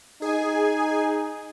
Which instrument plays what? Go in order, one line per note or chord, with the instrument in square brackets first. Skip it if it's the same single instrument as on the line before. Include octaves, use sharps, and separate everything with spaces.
[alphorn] D#4 [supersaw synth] G#4 G#5